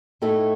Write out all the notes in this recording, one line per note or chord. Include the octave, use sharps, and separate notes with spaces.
A2 A3 D#4 A4